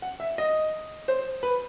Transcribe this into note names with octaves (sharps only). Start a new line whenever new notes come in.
F#5
E5
D#5
C5
B4